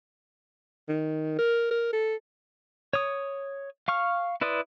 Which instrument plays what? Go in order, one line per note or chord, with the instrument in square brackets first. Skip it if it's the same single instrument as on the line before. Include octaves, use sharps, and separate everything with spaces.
[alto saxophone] D#3
A#4
A#4
A4
[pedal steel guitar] C#5 D#6
F5 C#6 F6
E4 B4 D5 C6 D#6